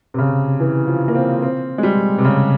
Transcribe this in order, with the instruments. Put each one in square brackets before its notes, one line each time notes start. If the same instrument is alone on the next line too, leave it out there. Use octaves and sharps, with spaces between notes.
[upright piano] C3
C#3
E3
F3
A#3
C4
C4
G#3
G3
C3
C#3